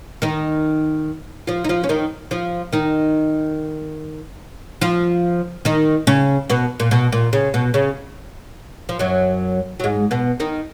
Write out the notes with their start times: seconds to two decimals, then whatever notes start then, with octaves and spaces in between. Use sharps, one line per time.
0.22 D#3 D#4
1.47 F3 F4
1.64 D#4
1.69 F3 F4
1.84 C#4
1.89 D#3 D#4
2.31 F3 F4
2.73 D#3 D#4
4.81 F3 F4
5.65 D#3 D#4
6.07 C#3 C#4
6.50 B2 B3
6.80 A#2
6.91 B2
7.12 A#2
7.33 C#3
7.54 B2
7.74 C#3
8.89 F3
8.99 F#2 F#3
9.80 F#3
9.84 G#2 G#3
10.11 B2 B3
10.40 D#3 D#4